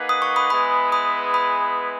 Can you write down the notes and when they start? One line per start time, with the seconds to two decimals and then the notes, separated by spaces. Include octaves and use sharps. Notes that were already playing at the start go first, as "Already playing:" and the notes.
Already playing: A#3 D#4 G#4 B4 F#5
0.09 D#6
0.22 C#6
0.36 B5 D#6
0.50 G#3 B3 E4 G#4 B4 B5 D#6
0.92 B5 D#6
1.34 B5 D#6